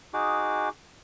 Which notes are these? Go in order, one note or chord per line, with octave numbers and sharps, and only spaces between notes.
D#4 F#4 G#4 D6